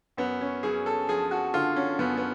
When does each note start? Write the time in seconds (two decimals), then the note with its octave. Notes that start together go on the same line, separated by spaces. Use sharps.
0.17 F#2 B3
0.41 C#4
0.63 F#2 G#4
0.86 A4
1.08 F3 G#4
1.31 F#4
1.54 D3 F4
1.76 C#4
1.99 F#2 B3
2.17 B3